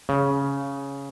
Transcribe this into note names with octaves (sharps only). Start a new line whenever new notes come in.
C#3